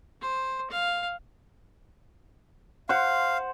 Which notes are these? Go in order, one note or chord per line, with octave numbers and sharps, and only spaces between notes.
C5
F5
C5 F5 F#5